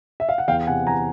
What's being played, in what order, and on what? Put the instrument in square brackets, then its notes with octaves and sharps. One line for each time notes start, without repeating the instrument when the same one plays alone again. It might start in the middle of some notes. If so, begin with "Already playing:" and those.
[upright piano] E5
F5
F#5
E2 F5 G5
C3 F#5 G#5
E3 G#5 A#5